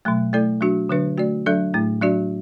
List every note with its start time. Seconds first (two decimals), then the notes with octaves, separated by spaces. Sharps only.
0.05 B2 F#3 A3
0.33 A3 E4 A4 D5
0.61 F#3 D4 F#4
0.89 D3 F#3 D4 B4
1.18 A3 F#4 D5
1.46 F#3 D4 A4 D5
1.74 A2 A3 E4
2.01 F#3 D4 F#4 D5